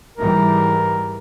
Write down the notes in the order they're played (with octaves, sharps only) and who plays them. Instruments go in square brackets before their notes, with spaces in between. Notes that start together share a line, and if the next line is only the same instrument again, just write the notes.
[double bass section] G#2 E3 G3 [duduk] A#4